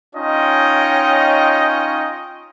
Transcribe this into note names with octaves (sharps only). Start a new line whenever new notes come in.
C#4 D#4 F4 C#5 D#5 G5